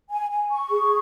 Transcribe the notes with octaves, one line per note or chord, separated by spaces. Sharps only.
G#5
G#5
C#6
G#4